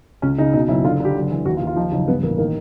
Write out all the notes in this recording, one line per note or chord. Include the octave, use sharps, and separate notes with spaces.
C#2 C#4
C#3 D#4
B2 D#4
F#1 E4
D3 F4
D3 G4
F#1
E3
D#2 F#4
F4
D#2
F4
F3 D#4
F#1 D#4
G2 B3
A1 A#3
D#3 A#3